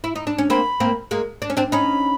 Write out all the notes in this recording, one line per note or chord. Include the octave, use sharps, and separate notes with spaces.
E4
D#4
D4
C#4
A#3 C4 B5
A#3 C4
G#3 A#3
D4
C#4
C4 D4
C#4 D#4 B5